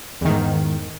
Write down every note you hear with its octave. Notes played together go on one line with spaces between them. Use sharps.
E2 G#2 D#3